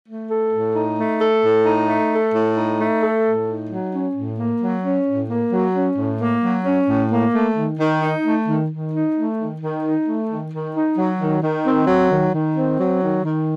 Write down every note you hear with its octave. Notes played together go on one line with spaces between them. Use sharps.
A3
A4
A2
D#4
A3
A4
A2
D#4
A3
A4
A2
D#4
A3
A4
A2
D#4
F#3
C#4
A2
A#3
F#3
C#4
A2
A#3
F#3
C#4
A2
A#3
F#3
C#4
A2
A#3
A3
D#3
D#3
D#4
A3
D#3
D#3
D#4
A3
D#3
D#3
D#4
A3
D#3
D#3
D#4
F#3
D#3
D#3
C4
F#3
D#3
D#3
C4
F#3
D#3
D#3